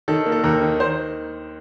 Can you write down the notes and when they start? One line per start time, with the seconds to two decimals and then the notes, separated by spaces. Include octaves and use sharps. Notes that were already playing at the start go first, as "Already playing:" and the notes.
0.08 D#3 A4
0.26 A#3
0.32 A4
0.44 D#2 A#4
0.61 D#3
0.80 C5